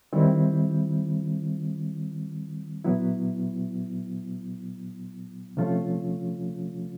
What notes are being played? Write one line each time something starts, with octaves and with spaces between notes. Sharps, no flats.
D#3 G3 C4 E4
A#2 F#3 B3 E4
C3 F3 A3 C#4 F4